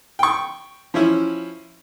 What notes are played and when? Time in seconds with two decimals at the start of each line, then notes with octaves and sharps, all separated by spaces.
0.19 G5 C#6
0.94 F3 C#4 E4